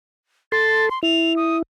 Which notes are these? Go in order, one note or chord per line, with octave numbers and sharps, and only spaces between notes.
A4 C6 A6
C6
E4 F7
D#6